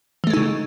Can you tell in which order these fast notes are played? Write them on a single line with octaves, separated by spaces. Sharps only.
E3 A3 G#3 D#4 C#3